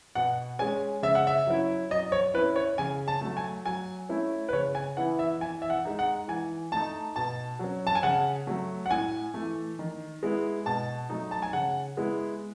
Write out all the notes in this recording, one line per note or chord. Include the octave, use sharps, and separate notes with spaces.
B2 F#5
G#3 C#4 G#5
C#3 E5
F#5
E5
F#3 C#4 E4
F#3 D#5
C#5
C#4 E4 B4
C#5
C#3 G#5
A5
F#3 A3
G#5
F#3 G#5
A3 C#4 E4
B4
C#3 C#5
G#5
E3 B3 E4 F#5
E5
E3 G#5
E5
F#5
G#3 D#4
F#5
E3 G#5
A3 D#4 A5
B2 A5
F#3 C#4
A5
G#5
C#3 F#5
F#3 A3
F#5
A2 G#5
E3 A3
D#3
G#3 B3 E4
B2 A5
F#3 A3 D#4
A5
G#5
C#3 F#5
G#3 B3 E4